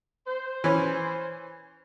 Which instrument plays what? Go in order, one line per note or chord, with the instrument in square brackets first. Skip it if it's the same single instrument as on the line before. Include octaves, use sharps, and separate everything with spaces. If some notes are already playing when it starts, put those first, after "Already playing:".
[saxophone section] C5
[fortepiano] E3 C#4